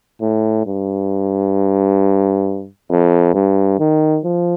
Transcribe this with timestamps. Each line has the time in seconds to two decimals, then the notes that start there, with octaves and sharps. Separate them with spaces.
0.21 A2
0.66 G2
2.90 F2
3.34 G2
3.79 D#3
4.24 F3